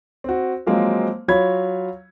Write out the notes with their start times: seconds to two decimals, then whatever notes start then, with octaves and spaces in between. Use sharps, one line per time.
0.24 C4 F#4
0.66 F3 F#3 G#3 A#3 C4
1.28 F#3 F4 C#5 B5 G#6